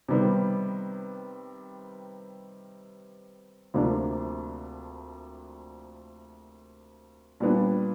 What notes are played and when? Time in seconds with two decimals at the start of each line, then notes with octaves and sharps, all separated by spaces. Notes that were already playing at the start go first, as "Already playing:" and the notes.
0.08 C3 D#3 G3 B3
3.74 D2 C3 F3 A#3 D4
7.40 A#2 G3 B3 D4